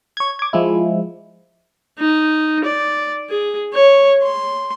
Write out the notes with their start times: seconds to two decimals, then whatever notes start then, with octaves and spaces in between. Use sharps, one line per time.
0.17 C#5 G#6
0.39 D6 G#6
0.53 F3 G#3 E4
1.99 D#4
2.64 D5
3.30 G#4
3.73 C#5
4.23 C6